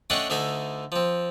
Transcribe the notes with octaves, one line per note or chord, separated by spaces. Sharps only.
A3 C#4 D4 D#5 F#5 G5
D2 D3 D#4 E5 G#5
F3 C4